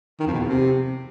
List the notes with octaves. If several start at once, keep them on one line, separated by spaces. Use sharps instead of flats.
D#3
F2
B2
E2
C3